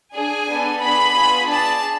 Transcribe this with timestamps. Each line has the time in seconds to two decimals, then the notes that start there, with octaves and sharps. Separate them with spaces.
0.15 D4 G#4 G#5
0.48 B3 D4 A4
0.82 B3 D4 G#4 B5
1.15 B3 F4 G#4
1.49 D4 G#4 A5